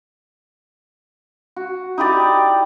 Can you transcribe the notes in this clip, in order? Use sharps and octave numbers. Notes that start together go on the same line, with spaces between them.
F#4
D#4 E4 G4 D5